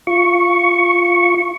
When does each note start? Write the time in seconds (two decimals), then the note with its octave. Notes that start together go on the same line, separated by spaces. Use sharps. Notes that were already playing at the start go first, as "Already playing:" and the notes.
0.07 F4 C#6